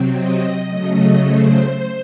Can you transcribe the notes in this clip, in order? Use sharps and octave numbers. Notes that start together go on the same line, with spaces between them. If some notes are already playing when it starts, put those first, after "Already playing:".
Already playing: C3 F#3 C4
D#5
C#3 F#3 A3
C5